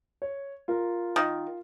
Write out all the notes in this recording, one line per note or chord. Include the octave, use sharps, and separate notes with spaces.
C#5
F4 A#4
D#3